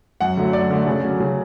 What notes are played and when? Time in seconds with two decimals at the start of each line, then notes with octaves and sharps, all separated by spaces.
0.21 F#2 F#5
0.37 D3 F#3 A3
0.53 F#2 D5
0.70 D3 F#3 A3
0.87 C#3
1.04 F#3 C#4
1.20 C#3